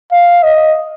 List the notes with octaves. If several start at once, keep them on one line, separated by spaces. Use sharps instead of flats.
F5
D#5